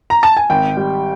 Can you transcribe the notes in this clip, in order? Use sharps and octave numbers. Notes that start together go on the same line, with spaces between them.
A#5
A5
G#5
G#1 G5
G3